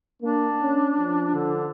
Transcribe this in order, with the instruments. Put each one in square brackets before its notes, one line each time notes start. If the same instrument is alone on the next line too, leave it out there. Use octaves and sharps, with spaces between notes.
[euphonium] A#3 [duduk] D4
[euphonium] C#4
F3
[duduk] D3